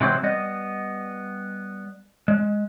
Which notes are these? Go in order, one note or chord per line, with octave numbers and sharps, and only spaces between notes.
C3 E3 F#3 G#3 C4
G3 B3 D#5
G#3